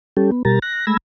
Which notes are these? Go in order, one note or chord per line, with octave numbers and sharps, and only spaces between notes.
G3 C#4 G4 A4
B3
B2 G3 G4 A#4 A#5 A6
F#6 A#6
G#3 A3 B5 E6 G#6 A#6